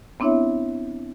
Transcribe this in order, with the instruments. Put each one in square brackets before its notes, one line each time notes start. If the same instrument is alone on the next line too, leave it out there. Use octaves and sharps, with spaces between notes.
[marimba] B3 C4 D4 E4 C#5 E5